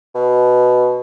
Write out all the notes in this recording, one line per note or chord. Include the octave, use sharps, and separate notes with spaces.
B2